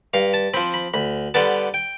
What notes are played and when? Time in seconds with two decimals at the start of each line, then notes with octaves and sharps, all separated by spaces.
0.14 G2 F5
0.34 A5
0.54 F3 C4 B5
0.74 B5
0.94 D2 B5
1.34 D3 G3 B3 A5
1.74 G5